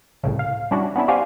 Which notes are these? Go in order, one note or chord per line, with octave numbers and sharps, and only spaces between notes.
C2 A2 C#3
F5
G3 C#4 D4 E4 F#4
B3 C#4 D4 E4
F#4 G4 C5 D5 F5 G#5